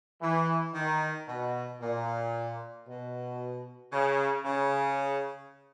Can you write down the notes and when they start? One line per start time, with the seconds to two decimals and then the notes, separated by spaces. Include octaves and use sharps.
0.21 E3
0.74 D#3
1.28 B2
1.81 A#2
2.86 B2
3.92 C#3
4.45 C#3